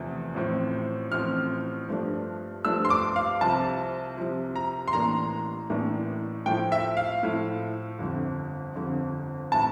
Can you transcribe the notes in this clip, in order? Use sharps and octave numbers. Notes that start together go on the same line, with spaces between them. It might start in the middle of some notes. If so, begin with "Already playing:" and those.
Already playing: E2 C3 F3 A3
A1 A2 F3 C4
A1 A2 F3 C4 F6
G2 F3 A3 D4
G2 F3 A3 D4 E6
C6
D6
F5
C2 C3 F3 A5
C2 C3 F3
A#5
C6
A1 A2 E3 A#3 D4 A#5
A1 A2 E3 A#3 D4
A2 F3 A3 E4 G5
E5
F5
A2 F3 A3 E4
G1 F2 D3
G1 F2 D3
A2 E3 A5